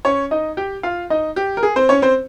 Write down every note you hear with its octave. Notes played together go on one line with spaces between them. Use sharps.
C#4 C#5
D#4 D#5
G4 G5
F4 F5
D#4 D#5
G4
A#4
G#4
C4 C5
C#4 C#5
C4 C5